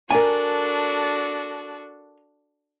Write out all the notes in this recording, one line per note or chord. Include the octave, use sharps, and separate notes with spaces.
D4 F#4 A4 A#4 G#5